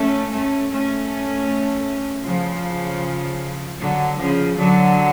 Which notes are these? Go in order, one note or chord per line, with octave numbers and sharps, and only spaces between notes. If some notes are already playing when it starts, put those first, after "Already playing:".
Already playing: A3 C#4
A3 C#4
A3 C#4
C#3 F3
D3 F#3
C#3 F3
D3 F#3